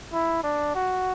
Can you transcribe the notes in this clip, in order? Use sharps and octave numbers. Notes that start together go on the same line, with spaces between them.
E4
D4
F#4